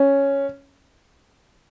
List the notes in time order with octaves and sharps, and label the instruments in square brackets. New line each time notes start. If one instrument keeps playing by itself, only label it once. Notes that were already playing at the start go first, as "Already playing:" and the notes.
Already playing: [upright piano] C#4